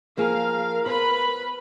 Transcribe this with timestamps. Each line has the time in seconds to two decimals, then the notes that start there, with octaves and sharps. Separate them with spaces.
0.17 F3 A#3 G#4 A#4 F5
0.86 B3 B4 C5 B5